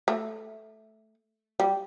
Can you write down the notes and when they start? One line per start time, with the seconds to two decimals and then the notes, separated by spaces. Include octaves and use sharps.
0.08 A3
1.60 G3